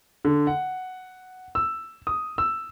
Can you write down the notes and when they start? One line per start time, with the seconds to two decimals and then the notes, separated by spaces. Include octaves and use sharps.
0.25 D3
0.47 F#5
1.55 E6
2.07 D#6
2.38 E6